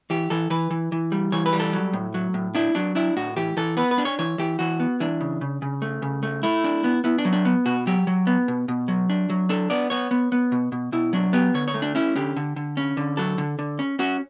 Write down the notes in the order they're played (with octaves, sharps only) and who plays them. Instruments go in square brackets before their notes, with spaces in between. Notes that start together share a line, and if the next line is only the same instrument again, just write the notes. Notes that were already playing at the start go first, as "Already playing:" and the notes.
[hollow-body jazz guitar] E3 G4
E3 A4
E3 B4
E3
E3
G3
E3 C#5
B4
G3
A4
F#3
A2
F#3
A2
D4 E4
F#3 D4
D4 E4
A2 F#4
E3 G4
E3 A4
B3 B4
B4
D4
C#5
E3 C#5
E3 G4
E3 F#4
B3
E3 D4
C#3
C#3
C#3
A3
C#3
A3
A3 E4
D4
B3
B3 E4
D4
F#3
D4
B3
B2 F#4
F#3 G4
F#3
B3
B2
B2
F#3
D4
F#3
D4 A4
B3 D5
B3 C#5
B3
B3
B2
B2
B2 E4
F#3 D4
B3 G4
D3 C#5
C#5
A3
D4
C#4 E4
D3 G4
D3
D3
C#4
D3
F#3 A4
D3
D3
C#4
C#4 F#4